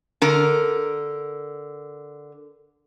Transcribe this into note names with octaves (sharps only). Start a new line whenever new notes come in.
D3 A#4